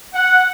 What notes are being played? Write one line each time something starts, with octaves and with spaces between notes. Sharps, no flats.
F#5